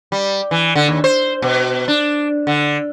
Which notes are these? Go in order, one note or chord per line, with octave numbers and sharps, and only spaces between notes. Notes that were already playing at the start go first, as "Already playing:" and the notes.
G3
E3
D3
D#2
C5
B2
D4
D3